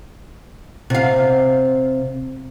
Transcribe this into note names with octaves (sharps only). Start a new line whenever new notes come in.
C3 F5